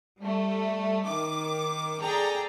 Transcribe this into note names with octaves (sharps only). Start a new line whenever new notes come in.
G3 A3
D#3 D6
G#4 A4 D5 G5 A#5